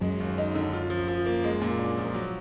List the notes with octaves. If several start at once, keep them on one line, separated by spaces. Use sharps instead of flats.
F#2 F#3 G#3
D#2
D#4
D3
F4
F3
F3
A#3
G#3
A#2
D4
F3
F#3